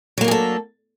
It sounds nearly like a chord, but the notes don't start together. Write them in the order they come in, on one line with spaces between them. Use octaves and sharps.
F#3 A#3 D4 G#4 A4